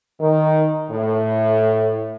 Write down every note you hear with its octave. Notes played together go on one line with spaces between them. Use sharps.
D#3
A2